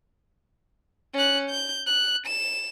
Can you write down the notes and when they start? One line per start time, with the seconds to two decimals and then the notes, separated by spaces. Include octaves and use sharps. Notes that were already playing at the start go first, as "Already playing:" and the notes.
1.14 C#4 F#6
1.50 G6
1.87 F#6
2.26 E7